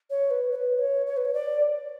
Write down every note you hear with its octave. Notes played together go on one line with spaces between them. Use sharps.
C#5
B4
C#5
B4
C#5
C#5
B4
C#5
D5